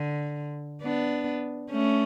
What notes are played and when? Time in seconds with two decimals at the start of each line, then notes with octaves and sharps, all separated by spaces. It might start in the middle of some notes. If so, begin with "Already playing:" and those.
Already playing: D3
0.82 B3 D4
1.71 A3 C#4